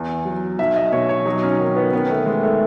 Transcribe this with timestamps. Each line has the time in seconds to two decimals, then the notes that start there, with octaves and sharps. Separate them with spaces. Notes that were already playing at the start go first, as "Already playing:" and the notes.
Already playing: E2
0.25 F#3
0.59 B1 E5
0.76 D#5
0.93 B2 C#5
1.09 C#5
1.26 F#3 D#4
1.43 C#4
1.59 D#3
1.76 B3
1.93 D#3 B3
2.10 A3
2.26 D#3 G#3
2.43 A3